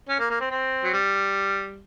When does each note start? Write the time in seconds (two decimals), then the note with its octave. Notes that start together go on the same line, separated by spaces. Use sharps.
0.09 C#4
0.19 A#3
0.30 A#3
0.40 C4
0.51 C4
0.84 F#3
0.93 G3